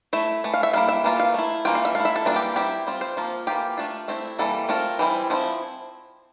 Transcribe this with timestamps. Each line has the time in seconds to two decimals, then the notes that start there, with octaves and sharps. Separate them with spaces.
0.13 A3 E4 E5
0.44 E3 A3
0.54 F5
0.63 E5
0.73 G3 A#3 E4 F5
0.89 E5
1.04 E3 A#3 F4
1.20 F5
1.34 A3 E4
1.65 E3 A#3 F4 G5
1.75 F5
1.85 E5
1.95 A3 E4 F5
2.05 E5
2.16 A4
2.25 E3 G3 A#3 D4 F4
2.36 G4
2.56 G3 C4 E4 G4
2.87 G3 C4 F4
3.01 C5
3.17 F3 A#3 F4
3.47 E3 A#3 F4 G4
3.78 A3 D4 F4
4.08 A3 C4 E4
4.39 E3 G3 A#3 A4
4.69 A3 C4 F4 A#4
4.99 E3 G3 C4 E4
5.30 F3 C4 E4